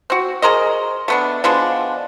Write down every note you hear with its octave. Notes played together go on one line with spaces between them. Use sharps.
C4 F#4
G#4 A#4 C5 D#5
A3 B3 D4
F3 G#3 B3 D4